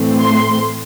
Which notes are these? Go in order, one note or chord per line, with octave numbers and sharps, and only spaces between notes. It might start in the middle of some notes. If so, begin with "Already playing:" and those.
Already playing: A2 E3 A3 C4
C6